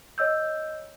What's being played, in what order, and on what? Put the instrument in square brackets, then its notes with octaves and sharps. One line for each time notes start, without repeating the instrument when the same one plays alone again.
[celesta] C#5 D#5 E6 G6